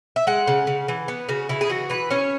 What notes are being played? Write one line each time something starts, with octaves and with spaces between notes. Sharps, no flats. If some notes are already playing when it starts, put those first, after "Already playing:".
E5
G#3 F#5
C#3
C#3
E3
B3
C#3 F#4
C#3 E4
G#4
E3 F#4
E3 B4
C#4 C#5